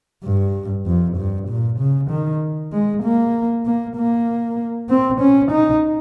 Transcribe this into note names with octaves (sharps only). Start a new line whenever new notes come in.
G2
F2
G2
A#2
C#3
D#3
G#3
A#3
A#3
A#3
C4
C#4
D#4